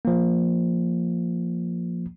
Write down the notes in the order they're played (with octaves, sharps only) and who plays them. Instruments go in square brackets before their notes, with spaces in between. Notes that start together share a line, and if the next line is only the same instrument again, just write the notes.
[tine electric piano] F3 A#3